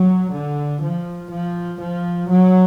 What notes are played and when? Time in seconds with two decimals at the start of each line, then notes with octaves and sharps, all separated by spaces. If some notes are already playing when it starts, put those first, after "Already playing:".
Already playing: F#3
0.34 D3
0.83 F3
1.31 F3
1.80 F3
2.29 F#3